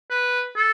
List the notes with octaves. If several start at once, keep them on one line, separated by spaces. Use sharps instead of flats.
B4
A4